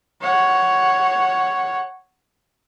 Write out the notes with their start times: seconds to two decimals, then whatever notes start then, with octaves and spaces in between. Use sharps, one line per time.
0.22 C#5 F#5